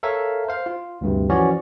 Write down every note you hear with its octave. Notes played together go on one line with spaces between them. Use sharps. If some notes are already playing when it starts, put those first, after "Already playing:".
A4 A#4 C#5 E5 F5
C5 F5
F4
D2 G2 C3
E3 F3 C#4 F#4 C#5 D5